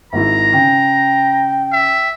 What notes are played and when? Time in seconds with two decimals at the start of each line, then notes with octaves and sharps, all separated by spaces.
0.13 G#1 G#2 E4 A#5
0.53 C#3 G5 A#6
1.73 E5